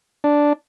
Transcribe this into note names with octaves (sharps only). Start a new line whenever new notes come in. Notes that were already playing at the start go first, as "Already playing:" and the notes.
D4